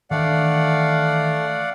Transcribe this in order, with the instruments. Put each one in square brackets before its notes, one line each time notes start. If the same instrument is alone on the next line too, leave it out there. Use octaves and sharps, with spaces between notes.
[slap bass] D#3 E3 D4 [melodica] A3 [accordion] D5 F5 F#5